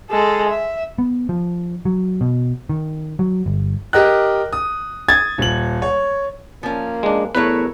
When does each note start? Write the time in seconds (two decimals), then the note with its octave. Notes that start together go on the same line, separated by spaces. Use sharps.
0.10 G#3 A4
0.49 E5
0.98 B3
1.29 F3
1.85 F#3
2.21 B2
2.69 D#3
3.19 F#3
3.46 G1
3.93 G4 A#4 D#5 G5 F#6
4.53 D#6
5.08 D#6 G#6 A6
5.38 D#1 F#7
5.82 C#5
6.63 F3 A#3 C#4
7.03 G#3 D4
7.35 E2 A3 E4 A#4 B4 C#5